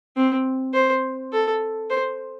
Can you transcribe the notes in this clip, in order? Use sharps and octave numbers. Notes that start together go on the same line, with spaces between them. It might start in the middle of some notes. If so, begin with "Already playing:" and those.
C4
C5
A4
C5